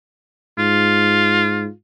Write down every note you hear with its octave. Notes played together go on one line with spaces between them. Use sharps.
G#2 F4